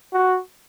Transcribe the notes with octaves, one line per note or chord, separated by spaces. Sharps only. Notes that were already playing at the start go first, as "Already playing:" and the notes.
F#4